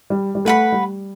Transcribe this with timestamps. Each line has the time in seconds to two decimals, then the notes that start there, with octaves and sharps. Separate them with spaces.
0.10 G3
0.35 G3
0.45 A3 B4 F#5 B5
0.72 G3